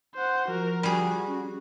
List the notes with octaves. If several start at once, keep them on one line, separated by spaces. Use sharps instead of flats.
C5 F#5
F3 F#4 A#4
G3 F#4 G#4
C#4